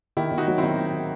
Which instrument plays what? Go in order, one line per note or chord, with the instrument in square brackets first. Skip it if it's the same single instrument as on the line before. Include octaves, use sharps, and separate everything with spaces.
[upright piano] D#3 [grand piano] E4 G4
[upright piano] D#3
[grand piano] D#4 F#4
[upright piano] F#3
[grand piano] C4 E4
[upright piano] D#3